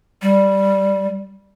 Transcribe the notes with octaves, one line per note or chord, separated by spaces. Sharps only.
G3